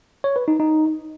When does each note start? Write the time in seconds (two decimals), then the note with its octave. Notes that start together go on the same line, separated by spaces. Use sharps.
0.24 C#5
0.36 B4
0.48 D#4
0.60 D#4